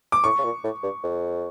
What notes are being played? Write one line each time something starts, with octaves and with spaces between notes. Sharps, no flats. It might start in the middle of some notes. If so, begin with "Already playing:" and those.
D6
A2 C#6
C#3
A#2
A2
G2
F2